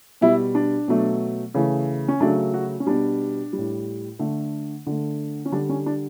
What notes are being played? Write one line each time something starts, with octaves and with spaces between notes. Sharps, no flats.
B2 G3 E4
D4
B2 F#3 A3
C#3 E3 A3
C#4
C#3 F#3 A3 D4
F#4
C#4
B2 G3 D4
A2 G3
D3 A3
D3 A3
C#4
D3 G3 D4
C#4
D4